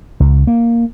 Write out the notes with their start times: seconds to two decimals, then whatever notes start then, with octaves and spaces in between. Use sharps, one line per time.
0.20 C#2
0.47 A#3